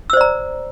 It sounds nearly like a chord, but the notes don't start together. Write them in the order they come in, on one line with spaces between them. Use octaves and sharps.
E6 C5 D5 A#5